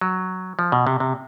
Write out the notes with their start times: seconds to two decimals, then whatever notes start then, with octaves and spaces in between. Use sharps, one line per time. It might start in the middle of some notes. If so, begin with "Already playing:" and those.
0.01 F#3
0.59 F3
0.72 B2
0.87 C3
1.00 C3